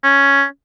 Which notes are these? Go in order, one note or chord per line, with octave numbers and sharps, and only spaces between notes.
C#4